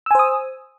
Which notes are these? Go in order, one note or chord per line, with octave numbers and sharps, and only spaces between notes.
C5 G#5 D#6 E6